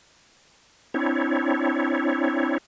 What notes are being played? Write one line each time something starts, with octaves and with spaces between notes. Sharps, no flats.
C4 D4 E4 C#5